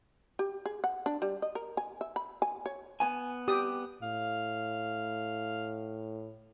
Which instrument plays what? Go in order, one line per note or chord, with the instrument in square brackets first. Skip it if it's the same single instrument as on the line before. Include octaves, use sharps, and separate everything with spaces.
[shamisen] G4
G#4
F#5
D4
G3
D#5
A#4
G#5
E5
B5
G#5
C#5
[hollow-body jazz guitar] B3 G#5
[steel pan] G4 D#6
[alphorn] A2 [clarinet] F5